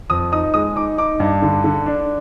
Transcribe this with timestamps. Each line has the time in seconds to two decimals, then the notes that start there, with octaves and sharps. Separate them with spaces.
0.10 F2 D#6
0.32 D#4 D#6
0.54 G#3 D#6
0.76 D#4 D6
0.98 D#4 D6
1.20 G2
1.42 D3
1.64 D3
1.86 D4